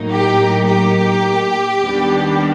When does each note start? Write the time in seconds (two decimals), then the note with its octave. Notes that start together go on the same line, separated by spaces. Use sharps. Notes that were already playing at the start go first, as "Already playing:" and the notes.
Already playing: A2 F#3 A#3 D#4
0.11 G4
0.68 G4
1.82 D#2 D#3 G3 B3 D4